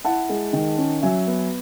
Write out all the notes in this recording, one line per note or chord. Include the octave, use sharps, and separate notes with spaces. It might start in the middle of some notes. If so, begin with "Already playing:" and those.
E4 F#5 A5
G#3
D#3
C#4
F#3 E5 G#5
B3